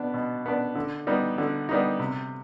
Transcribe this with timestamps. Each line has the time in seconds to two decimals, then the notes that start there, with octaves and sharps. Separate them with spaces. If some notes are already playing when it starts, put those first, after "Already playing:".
Already playing: B2 B3 D4
0.14 B2
0.46 B3 D4
0.75 D3
1.07 G3 B3 D#4
1.38 D3
1.69 G3 B3 D#4
1.99 C3